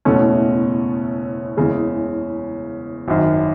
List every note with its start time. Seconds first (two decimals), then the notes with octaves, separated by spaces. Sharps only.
0.05 F#1 E2 B2 A3 C#4
1.57 F#1 E2 C#3 G#3
3.08 G#1 F#2 D#3